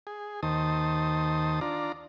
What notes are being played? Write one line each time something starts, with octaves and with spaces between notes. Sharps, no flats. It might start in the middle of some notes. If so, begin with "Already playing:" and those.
G#4
D#2 D#3 C5 A5 D#6
D4 F4 D5 A#5